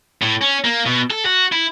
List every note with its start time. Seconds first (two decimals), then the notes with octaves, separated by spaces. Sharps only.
0.22 A2
0.41 C#4
0.64 A#3
0.86 B2
1.10 A4
1.25 F#4
1.52 E4